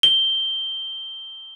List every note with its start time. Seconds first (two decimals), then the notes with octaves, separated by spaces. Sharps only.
0.03 G7